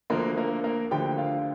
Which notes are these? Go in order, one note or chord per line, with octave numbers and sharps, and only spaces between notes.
D2 D3 F3 A#3 A#4
A#3 A#4
A#3 A#4
D2 D3 F3 G4 G5
F4 F5